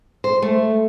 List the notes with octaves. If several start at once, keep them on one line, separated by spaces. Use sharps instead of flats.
C5
A3